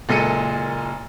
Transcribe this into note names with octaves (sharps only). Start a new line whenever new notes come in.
F#1 A#2 G#3 A4 C#7 D#7